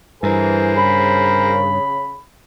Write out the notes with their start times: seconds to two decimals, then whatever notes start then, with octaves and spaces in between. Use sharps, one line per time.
0.23 G2 E3 G#4 A#4 C5
0.76 C#3 B5